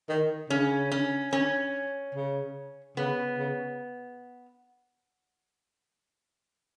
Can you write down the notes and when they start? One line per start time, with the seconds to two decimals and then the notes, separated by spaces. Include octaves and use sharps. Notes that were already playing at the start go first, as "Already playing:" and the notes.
0.09 D#3
0.50 C#3 C#4
0.92 C#4
1.33 C#4
2.15 C#3
2.97 C#3 B3
3.38 C#3